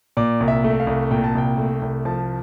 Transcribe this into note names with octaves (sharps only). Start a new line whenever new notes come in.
A#2 D5
C2
E5
A3
F5
C2
A#2 G5
A5
C2 G5
A3
C2
F3 A5